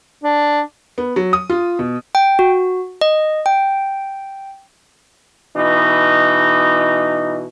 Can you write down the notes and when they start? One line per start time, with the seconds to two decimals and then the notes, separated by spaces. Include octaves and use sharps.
0.24 D4
0.98 B3
1.16 F#3
1.33 D#6
1.50 F4
1.79 B2
2.15 G5
2.39 F#4
3.01 D#5
3.46 G5
5.55 B2 E3 D#4